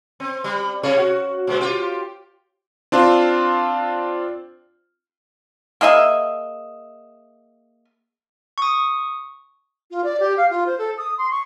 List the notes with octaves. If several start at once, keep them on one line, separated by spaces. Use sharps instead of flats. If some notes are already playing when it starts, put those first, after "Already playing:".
C4
G3
C3 G#4 C#5
F#4
B2 G#3 A#3
F4 G4
C4 D4 F4
A#3 G#4 D#5 E5
C#6 D#6
F4
D5
G4
F5
F4
C5
A4
D#6
C6
C#6